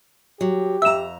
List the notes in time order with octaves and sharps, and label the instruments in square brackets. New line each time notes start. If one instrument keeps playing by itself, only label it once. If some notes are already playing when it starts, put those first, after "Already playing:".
[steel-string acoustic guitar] F#3 [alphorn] G4
[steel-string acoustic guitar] F2 A#5 [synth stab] E5 E6